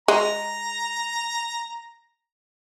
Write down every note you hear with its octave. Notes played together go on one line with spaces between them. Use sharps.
G#3 A#5